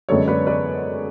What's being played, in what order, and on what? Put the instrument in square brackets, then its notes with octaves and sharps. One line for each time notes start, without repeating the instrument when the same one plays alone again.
[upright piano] F#2 D3 G#3 B3 A4 C#5
B4 D5
B4 D5